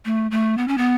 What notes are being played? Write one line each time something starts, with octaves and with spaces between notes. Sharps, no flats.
A3
A3
B3
C#4
B3